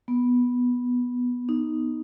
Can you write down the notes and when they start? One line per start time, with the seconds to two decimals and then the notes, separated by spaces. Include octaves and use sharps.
0.08 B3
1.49 D#4